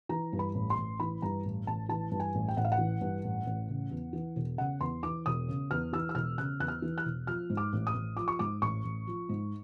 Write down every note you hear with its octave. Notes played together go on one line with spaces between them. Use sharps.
E3 A#5
G2
B5
A1
C6
A1
E3 B5
G2 A#5
A1
A1 A5
E3 A5
G2
G#5
A1
G5
A1 F#5
F5
F#5
E3
G2
A1
A1
C#3
E2
E3
E1
C#3 F#5
E2 C6
E3 D6
E1 D#6
C#3
E2 F6
E3 E6
E6
E1 F6
C#3 F#6
E2 F#6
F6
E3
F#6
E1
F3 F6
G#2
D6
A1
D#6
A1
F3 D6
C#6
G#2 D6
A1 C#6
A1
F3
G#2